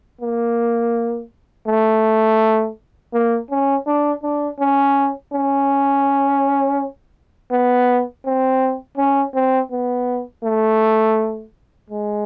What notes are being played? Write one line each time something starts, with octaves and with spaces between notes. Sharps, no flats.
A#3
A3
A#3
C#4
D4
D4
C#4
C#4
B3
C4
C#4
C4
B3
A3
G#3